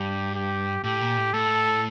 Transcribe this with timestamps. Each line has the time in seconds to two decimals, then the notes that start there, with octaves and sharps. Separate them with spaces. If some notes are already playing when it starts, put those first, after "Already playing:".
Already playing: G2 G4
0.35 G4
0.84 A2 G4
1.01 A#2
1.17 A2
1.34 A2 A4